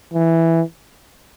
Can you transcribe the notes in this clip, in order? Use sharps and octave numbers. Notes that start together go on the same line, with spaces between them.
E3